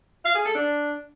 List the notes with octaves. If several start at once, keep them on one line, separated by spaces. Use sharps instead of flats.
F5
G#4
A4
D4